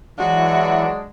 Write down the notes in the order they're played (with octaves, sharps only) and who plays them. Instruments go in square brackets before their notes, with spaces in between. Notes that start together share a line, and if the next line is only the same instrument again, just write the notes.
[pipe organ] E3 [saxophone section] F#3 G#3 D4 [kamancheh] F#4